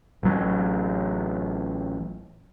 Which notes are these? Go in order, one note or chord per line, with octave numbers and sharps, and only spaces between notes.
A1 F#3